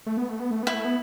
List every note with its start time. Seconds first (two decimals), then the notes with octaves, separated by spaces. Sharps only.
0.06 A3
0.17 B3
0.29 A3
0.40 B3
0.51 A3
0.63 B3 E4
0.74 A3
0.85 B3